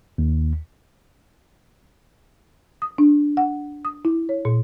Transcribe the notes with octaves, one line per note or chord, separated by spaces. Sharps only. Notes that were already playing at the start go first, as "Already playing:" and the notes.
D#2
D#6
D4
F#5
D#6
E4
C#5
A#2